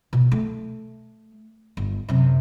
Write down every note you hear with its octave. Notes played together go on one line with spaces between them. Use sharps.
B2
A3
G1
F#2 C3